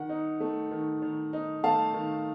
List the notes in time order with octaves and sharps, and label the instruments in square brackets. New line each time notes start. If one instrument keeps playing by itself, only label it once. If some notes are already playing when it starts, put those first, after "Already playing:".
Already playing: [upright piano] D#3 F#5
D#4
A3
D#3
D#3
D#4
A3 F5 A5
D#3